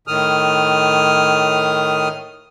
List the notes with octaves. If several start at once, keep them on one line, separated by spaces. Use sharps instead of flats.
A2 D#3 D#6 F6